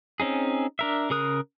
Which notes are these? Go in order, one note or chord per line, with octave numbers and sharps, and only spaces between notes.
C4 C#4 D#4 G#4
D4 A#4 E5
C#3 G#4 A#4 D#6 F#6